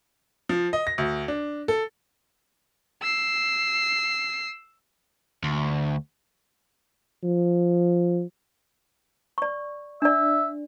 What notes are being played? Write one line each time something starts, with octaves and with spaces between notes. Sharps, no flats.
F3
D#5
A#6
D2
D4
A4
E6 C7
D2
F3
D5 C#6
D4 D5 E5